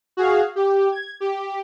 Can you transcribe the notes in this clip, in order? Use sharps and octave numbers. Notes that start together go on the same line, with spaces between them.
F#4 G#4 F5
G4
G#6
G4